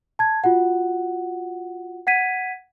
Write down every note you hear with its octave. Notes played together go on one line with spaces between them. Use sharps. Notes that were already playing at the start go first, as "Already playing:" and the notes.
A5 G#6
F4 F#4 F#5
F#5 G#6 B6 D#7